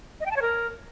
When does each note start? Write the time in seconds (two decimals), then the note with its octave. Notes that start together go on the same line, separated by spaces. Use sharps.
0.20 D#5
0.26 G5
0.31 A5
0.36 C#5
0.42 A#4